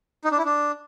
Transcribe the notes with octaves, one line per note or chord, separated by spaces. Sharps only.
D#4
D4
E4
D4